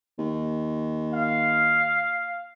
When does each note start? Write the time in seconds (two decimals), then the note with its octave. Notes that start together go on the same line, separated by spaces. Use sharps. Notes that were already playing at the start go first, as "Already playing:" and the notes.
0.18 D#2
1.14 F5